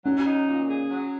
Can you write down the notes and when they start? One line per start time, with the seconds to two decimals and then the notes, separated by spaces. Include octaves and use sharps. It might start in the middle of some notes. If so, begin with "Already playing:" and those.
0.05 F#3 C#4
0.27 D#4
0.47 A#2
0.69 G#4
0.89 F#3